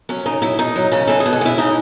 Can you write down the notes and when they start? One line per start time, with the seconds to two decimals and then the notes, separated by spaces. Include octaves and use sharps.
0.09 F#3 C#4
0.26 C#3 D#4
0.42 F#3 E4
0.59 B2 D#4
0.76 F#3
0.92 C#3 C#4
1.07 E3 G#3 A4
1.20 G#4
1.26 B2
1.33 F#4
1.41 G#3 E4
1.58 C#3 D#4